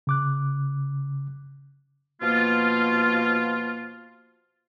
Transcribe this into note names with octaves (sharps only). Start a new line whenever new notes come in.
C#3 D6 F#6
B2 F3 A#3 F4